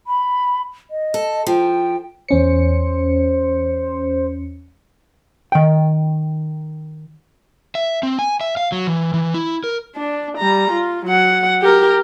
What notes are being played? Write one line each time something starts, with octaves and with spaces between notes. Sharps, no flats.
B5
D#5
A4
F3 G5
E2 C#4 C5 C#7
D#3 G5
E5
C4
G#5
E5
F5
F#3
E3
E3
E4
A#4
D4
G3 A#5
F4
F#3 F#5
G4 A#4